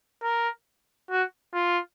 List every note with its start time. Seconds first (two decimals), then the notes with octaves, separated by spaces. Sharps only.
0.23 A#4
1.11 F#4
1.54 F4